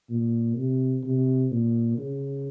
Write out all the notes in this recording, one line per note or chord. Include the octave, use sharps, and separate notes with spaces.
A#2
C3
C3
A#2
C#3